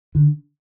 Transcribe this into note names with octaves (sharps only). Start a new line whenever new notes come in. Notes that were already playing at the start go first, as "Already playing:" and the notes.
D3